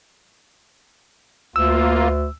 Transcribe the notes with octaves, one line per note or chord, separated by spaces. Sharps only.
D2 A#3 F4 E6